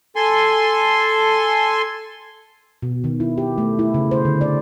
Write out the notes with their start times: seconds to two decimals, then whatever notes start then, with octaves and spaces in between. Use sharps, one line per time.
0.16 A4 G#5 C6
2.82 B2
3.04 D#3
3.20 E4
3.38 G4
3.58 A3
3.79 E4
3.94 C#3
4.11 C5
4.25 D3
4.41 D5